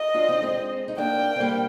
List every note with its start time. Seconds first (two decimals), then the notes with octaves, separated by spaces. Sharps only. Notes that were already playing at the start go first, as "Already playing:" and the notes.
Already playing: D#5
0.14 D4 F4
0.28 C4 D#4
0.42 G#3 C4
0.88 D#4
0.98 A#3 D4 G5
1.36 C4
1.40 G3 A#3